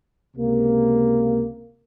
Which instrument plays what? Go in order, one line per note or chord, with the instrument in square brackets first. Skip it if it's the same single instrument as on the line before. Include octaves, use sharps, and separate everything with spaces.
[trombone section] C#2 C3 A#3